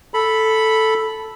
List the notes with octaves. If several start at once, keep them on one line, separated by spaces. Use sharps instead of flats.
A4 B5